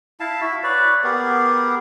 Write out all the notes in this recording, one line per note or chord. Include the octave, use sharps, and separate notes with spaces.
E4 F5 A5
E4 F#4 E5
B4 C#5 D5
B3 G4 G#4 A#4